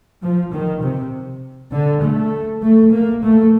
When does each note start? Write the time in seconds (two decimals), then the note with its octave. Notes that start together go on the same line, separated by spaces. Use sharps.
0.23 F3
0.52 D#3
0.83 C3
1.72 D3
2.03 A3
2.62 A3
2.92 A#3
3.23 A3